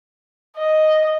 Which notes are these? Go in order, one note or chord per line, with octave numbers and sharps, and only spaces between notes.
D#5